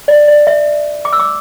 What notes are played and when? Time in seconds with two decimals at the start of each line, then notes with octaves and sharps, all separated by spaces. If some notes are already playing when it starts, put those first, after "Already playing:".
0.08 D5
0.28 D5
0.47 E5
1.05 D6
1.13 E6
1.19 D6